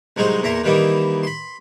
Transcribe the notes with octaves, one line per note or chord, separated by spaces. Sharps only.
C2 F#3 G#3 D#4 C5
E2 A#2 E5 A#5 C6
D#3 E3 G3 A#3 D#4 E4
B5 C6